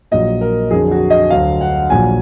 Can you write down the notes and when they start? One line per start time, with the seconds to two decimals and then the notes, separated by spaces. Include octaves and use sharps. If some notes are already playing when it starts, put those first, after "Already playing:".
0.11 A#1 A#2 F#3 D#5
0.41 A#4
0.71 F2 D3 F#3 G#4
0.91 F#4
1.10 D#5
1.30 D2 D3 F#3 F5
1.61 F#5
1.90 A#1 A#2 F#3 G#5